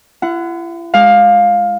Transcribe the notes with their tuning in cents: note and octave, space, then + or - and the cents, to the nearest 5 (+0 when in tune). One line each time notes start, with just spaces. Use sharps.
E4 +45 F#5 +0
G#3 +0 F5 +15